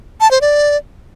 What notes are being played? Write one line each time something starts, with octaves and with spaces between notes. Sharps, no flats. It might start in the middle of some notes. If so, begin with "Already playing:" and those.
A5
C5
D5